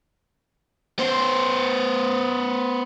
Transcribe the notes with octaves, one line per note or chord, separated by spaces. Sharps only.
B3 C5